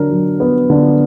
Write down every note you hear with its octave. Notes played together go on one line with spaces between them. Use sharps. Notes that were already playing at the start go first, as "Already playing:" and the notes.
Already playing: D3 F#3 D4 A#4
F#3
B3
D3